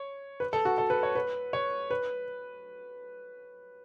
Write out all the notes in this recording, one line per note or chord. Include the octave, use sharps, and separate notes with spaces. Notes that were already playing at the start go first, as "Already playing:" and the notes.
Already playing: C#5
B4
A4
F#4
A4
B4
C#5
B4
C#5
B4